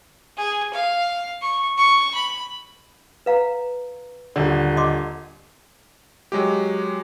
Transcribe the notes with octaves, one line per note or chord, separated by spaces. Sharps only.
G#4
F5
C#6
C#6
B5
B4 F5 A#5
D#1 D3 D5
D#5 C6 D6
F#3 G#3 G4